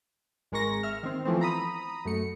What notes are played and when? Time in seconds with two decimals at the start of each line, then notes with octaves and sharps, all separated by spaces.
0.52 G#1 G#3 A#4 C#6 A#6
0.83 E5 F6
1.03 D#3 C4
1.25 E3 F3 A3 B3 C4
1.41 A#5 B5 D#6
2.05 F#2 A3 C#7